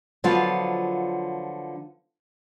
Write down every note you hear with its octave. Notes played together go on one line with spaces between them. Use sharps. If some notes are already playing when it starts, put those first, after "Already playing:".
D3 F3 F#3 B3 F4 F5